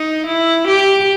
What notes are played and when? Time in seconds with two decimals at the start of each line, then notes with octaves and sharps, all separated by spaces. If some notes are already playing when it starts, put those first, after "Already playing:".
Already playing: D#4
0.26 E4
0.68 G4